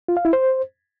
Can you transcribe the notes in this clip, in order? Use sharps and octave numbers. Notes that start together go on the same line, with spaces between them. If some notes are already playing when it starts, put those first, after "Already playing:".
F4
F5
E4
C5